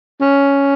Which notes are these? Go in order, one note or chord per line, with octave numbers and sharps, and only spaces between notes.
C#4